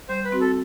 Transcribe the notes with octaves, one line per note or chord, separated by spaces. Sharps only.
G3 C5
B4
C4 F#4
A4